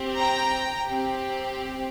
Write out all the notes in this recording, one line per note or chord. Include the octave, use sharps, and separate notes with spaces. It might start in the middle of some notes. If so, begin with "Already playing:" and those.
Already playing: C4 G4
G5 A#5
C4 G4